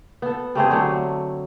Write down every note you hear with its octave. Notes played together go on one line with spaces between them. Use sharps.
B3 A4
G3 A3 C4 G#4
D3 F#3 A3